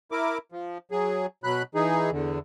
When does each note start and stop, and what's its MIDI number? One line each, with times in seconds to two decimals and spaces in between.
0.12 0.38 64
0.12 0.38 70
0.12 0.38 86
0.52 0.78 53
0.91 1.26 54
0.91 1.26 68
1.44 1.63 47
1.44 1.63 54
1.44 1.63 83
1.44 1.63 90
1.75 2.10 52
1.75 2.10 63
1.75 2.10 68
2.11 2.39 40
2.11 2.39 50